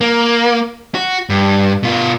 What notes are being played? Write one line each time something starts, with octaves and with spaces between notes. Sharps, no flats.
A#3
F#4
G2
B2 F4